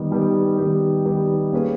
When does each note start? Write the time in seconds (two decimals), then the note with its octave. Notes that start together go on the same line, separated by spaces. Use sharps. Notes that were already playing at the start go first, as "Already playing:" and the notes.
Already playing: D#3 G3 B3 G4
0.11 D#3 G3 B3 G4
0.58 D#3 G3 B3 G4
1.05 D#3 G3 B3 G4
1.52 A#3 C#4 G#4 B4